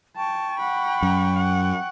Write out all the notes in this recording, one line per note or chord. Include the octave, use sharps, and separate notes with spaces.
G5 A5 C#6
F#5 B5
F#2
F#5